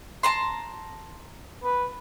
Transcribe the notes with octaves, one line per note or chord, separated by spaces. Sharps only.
A5 A#5 C6
B4